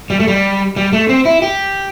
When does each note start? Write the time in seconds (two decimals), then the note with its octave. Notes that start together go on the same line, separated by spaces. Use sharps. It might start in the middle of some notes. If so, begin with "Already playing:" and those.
0.10 G3
0.20 A3
0.28 G3
0.76 G3
0.93 A3
1.09 C4
1.25 E4
1.42 G4